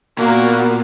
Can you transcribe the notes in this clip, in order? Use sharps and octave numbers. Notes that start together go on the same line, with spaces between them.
A#2 A#3 B3 F#4